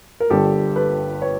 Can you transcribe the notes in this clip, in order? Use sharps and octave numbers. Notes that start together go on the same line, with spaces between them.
A#4
G1 G2 D3 G3 G4 A4
A4 B4
B4 C#5